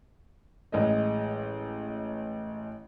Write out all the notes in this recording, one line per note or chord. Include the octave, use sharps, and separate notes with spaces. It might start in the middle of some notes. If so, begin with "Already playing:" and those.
A1 G#3 D#5